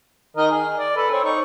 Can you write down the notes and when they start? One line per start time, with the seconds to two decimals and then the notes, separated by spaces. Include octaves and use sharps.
0.37 D#3 A#4 D#5
0.51 G#4
0.77 D5
0.96 A4 B4
1.12 C4 C#5
1.24 D#4 C#6